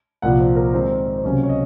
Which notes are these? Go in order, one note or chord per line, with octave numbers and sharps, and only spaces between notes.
C2 A#2 F3 F#5
C5
A#4
G#2 D#3 G#3 C4 D#4 C5
C5
C#2 C3 F#3 A#3 C#4 C#5
C#5
D#5